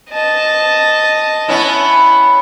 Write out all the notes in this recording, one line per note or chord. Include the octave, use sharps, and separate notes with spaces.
D#5 A5
B3 C#4 E4